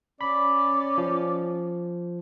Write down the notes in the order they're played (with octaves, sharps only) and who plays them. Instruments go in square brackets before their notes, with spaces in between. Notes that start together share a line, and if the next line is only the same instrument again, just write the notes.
[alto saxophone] C#4 [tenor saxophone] D5 [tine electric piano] B5
[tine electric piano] F3